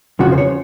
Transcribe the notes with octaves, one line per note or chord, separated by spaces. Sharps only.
F2 C#3 F3 F#4
C5
C#5